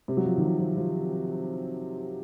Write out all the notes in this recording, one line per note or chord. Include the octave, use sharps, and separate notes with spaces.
C3
F#3
F3
D#3
F3
F3
F3